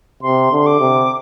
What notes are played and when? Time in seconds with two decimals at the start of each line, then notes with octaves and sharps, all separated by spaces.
0.22 C3 C6
0.52 D3
0.59 C6
0.66 D6
0.80 C3